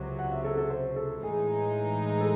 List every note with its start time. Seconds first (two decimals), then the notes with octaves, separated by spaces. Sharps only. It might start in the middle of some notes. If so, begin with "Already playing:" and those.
Already playing: C#2 C3 F#3
0.19 F#5
0.32 E5
0.44 A4
0.57 A4
0.70 C5
0.96 A4
1.22 A2 E3 G#3 D#4 G#4
2.21 A4